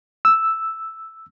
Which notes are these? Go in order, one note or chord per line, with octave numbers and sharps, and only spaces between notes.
E6